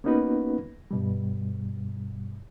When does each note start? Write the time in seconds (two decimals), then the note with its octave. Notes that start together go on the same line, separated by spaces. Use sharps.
0.04 A#3 B3 C#4 D#4 F#4 B4
0.91 G2 B2 G3